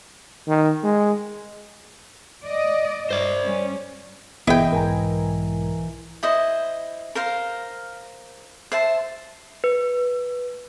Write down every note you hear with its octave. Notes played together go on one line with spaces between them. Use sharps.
D#3
G#3
D5 D#5
G2 C5 D5
G3 C#4
G1 B2 E3 B3 E4 G#4 D#5 G5
B1 G#2 A#4 G#5 A#5
E4 C5 D#5
A#4 C5 F5
C5 E5 A5
B4